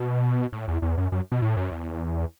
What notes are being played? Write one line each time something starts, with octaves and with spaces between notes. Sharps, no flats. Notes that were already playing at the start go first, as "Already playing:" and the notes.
Already playing: B2
A2
E2
E2
F#2
F#2
B2
A2
F#2
E2